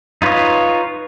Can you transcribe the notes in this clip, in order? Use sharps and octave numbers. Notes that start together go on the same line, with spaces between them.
D#4 F4 B4 C#5 D#5